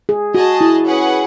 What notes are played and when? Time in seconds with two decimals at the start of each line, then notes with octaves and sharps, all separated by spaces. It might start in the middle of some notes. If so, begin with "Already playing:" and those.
0.09 G#4
0.35 F#4 G#4 D#5 A5
0.61 E4
0.86 C#4 G#4 B4 F#5